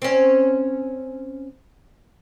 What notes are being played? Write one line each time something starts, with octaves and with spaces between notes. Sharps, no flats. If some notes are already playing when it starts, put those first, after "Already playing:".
C4 C#4